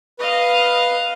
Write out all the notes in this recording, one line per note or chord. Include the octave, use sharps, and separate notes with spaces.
B4 D#5 F5